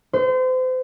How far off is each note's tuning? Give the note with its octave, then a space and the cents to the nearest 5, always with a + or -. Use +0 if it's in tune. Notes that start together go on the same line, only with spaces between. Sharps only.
C5 -35